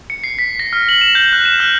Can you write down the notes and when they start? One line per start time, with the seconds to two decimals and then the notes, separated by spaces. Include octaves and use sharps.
0.10 C#7
0.24 C7
0.39 B6
0.59 A#6
0.73 F6
0.89 F#7
1.01 E7
1.15 G6
1.33 F#6
1.45 E7
1.60 F6